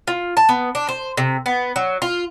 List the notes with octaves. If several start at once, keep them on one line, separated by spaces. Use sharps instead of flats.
F4
A5
B3
D4
C5
C3
B3
F#3
F4